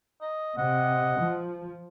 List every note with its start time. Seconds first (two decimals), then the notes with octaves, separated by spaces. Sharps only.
0.21 D#5
0.58 C3 D#5 F#5
1.19 F3